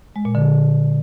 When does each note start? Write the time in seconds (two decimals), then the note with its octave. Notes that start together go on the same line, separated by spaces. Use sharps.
0.16 G#3
0.25 A#2
0.35 D3